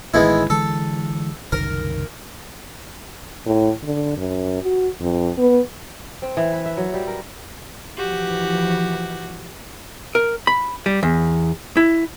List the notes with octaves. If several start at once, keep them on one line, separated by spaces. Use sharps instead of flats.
A1 D#3 G#3 B3 E4
D3 E3 G#3 A4
F#1 C2 D#3 A#4
A2
D3
F#2
F#4
F2
B3
C4
E3
B4
E5
F#3
G3
A#4
E3 F3 F#4 G4
A#4
B5
G3
E2
E4